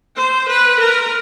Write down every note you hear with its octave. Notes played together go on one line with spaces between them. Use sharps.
C5
B4
A#4